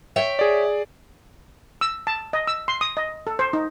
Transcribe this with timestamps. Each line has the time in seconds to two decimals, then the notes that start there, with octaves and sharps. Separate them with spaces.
0.16 C#5 E5 G5
0.39 G#4 D5
1.81 E6
2.07 A5
2.33 D#5
2.47 E6
2.68 C6
2.81 D#6
2.97 D#5
3.27 A4
3.39 C5
3.53 D#4